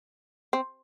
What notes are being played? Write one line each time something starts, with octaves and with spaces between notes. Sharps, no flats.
C4